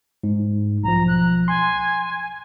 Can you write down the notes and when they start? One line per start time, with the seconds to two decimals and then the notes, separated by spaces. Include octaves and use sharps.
0.23 G#2
0.84 B1 F3 A#5
1.08 F#6
1.48 G#5 C6